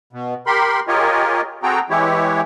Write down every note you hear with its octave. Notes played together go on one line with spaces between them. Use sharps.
B2
G4 A#4 B5 C6
F4 G4 G#4 A#4 C#5 D#5
C4 F#4 G#4 A4 G5 A#5
E3 G#3 E4 G4 C#5